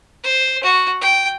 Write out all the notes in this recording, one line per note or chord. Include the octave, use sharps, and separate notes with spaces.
C5
F#4
G5